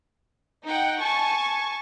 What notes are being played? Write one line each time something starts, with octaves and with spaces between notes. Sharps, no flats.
D#4 F#5 G5
G#5 A5 C#6